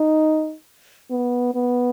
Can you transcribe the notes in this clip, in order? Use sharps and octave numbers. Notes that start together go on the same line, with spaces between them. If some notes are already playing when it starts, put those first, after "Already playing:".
Already playing: D#4
B3
B3